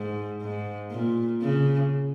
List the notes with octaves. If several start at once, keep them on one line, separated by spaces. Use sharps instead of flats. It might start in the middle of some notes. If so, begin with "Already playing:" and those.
Already playing: G#2
G#2
A#2
C#3